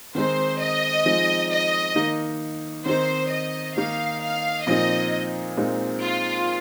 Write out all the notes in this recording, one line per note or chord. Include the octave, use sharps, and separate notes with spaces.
D#3 G#3 C4 D#4 C5
D#5
F3 G#3 C4 D#4
D#5
D#3 A#3 D#4
D#3 C4 D#4 C5
D#5
D#3 A#3 D#4 F5
F5
A#2 F3 C4 D#4 D#5
A#2 G#3 C4 D#4
F4